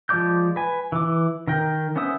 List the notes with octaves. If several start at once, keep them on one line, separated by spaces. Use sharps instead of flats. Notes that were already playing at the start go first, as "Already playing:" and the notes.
F3 G#3 D5 D6 G6
B4 G#5
E3 D6
D#3 A#4 G5
B3 C#4 C5 E5 D#6